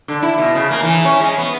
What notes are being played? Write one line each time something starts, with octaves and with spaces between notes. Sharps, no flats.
D3
E4
B2
C#3
A#3
E3
C#4
G#3
B3